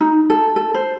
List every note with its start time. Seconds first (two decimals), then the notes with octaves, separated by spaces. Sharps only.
0.01 D#4
0.30 A4
0.56 A4
0.74 C5